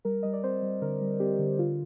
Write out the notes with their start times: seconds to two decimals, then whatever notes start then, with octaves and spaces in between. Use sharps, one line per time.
0.05 G3 A#4
0.23 G3 D#5
0.33 D5
0.43 C4 C5
0.62 G3
0.81 D3 A#4
1.01 G3
1.20 C4 G4
1.39 D3
1.58 D3 F4